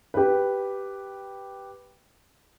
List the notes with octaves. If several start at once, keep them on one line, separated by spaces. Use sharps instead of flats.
G4 B4